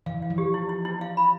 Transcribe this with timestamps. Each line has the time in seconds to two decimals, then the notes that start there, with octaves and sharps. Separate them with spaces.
0.06 E3 F5
0.22 F5
0.30 F3
0.38 G4
0.54 E4
0.69 E4
0.85 E4
1.01 F5
1.17 B5